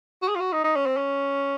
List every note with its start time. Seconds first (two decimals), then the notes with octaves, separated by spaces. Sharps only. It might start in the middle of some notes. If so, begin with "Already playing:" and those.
0.22 F#4
0.28 G#4
0.35 F4
0.40 F#4
0.53 D#4
0.64 D#4
0.76 C#4
0.86 C4
0.97 C#4